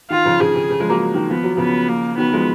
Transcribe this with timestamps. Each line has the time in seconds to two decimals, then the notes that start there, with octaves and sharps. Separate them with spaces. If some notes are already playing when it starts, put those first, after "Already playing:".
0.10 D#3 F4
0.26 C#3 F3
0.40 C#3 F3 G#4
0.55 C#3
0.70 C#3
0.80 F3 G#3
0.90 F#3 A#3
1.14 D#3 F#3
1.29 F3 B3
1.44 F#3
1.57 C#3 F3 B3
1.89 A#3
2.18 D#3 F#3 B3
2.33 F3 G#3